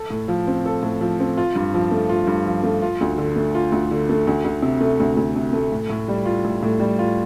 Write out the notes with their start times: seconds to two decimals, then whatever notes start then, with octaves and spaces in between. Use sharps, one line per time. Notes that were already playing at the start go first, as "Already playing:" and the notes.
Already playing: A4
0.10 A2
0.28 F3
0.47 C4
0.66 A4
0.83 A2
1.01 F3
1.20 C4
1.37 F4
1.55 G2
1.74 F3
1.91 A3
2.09 F4
2.27 G2
2.46 F3
2.63 A3
2.82 F4
3.01 D2
3.18 D3
3.36 A3
3.55 F4
3.72 D2
3.91 D3
4.09 A3
4.27 D2
4.44 D2
4.63 C3
4.81 A3
5.00 D2
5.17 D2
5.36 C3
5.53 A3
5.72 A2
5.90 A2
6.08 G3
6.25 F4
6.45 A2
6.63 A2
6.80 G3
6.99 F4